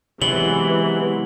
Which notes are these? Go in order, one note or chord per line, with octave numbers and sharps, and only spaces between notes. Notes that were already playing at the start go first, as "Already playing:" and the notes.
C3 E3 F#3 G#3 B3 F#7 G7